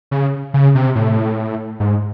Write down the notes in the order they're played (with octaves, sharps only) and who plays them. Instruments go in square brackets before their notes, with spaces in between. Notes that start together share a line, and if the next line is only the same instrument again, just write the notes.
[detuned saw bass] C#3
C#3
C3
A2
G#2